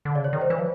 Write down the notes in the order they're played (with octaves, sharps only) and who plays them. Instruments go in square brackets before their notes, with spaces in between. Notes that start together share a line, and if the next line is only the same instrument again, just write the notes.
[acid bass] D3
[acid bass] C#3 [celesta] D5
[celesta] C#5
[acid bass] D#3
[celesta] C5
[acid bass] E3 [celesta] B4
[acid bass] F3